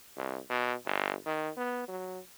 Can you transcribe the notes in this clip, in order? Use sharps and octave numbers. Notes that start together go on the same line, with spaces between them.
C2
B2
G1
D#3
B3
F#3